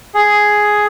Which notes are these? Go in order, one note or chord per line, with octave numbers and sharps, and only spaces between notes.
G#4